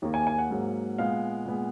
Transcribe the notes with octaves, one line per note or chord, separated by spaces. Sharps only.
D#2 D#3 A#3
G#5
G#5
F#5
G#2 F#3 A#3
A#2 G#3 B3 F5
A#2 G#3 B3